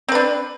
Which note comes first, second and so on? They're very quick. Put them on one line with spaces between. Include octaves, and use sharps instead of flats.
C4 B4 D4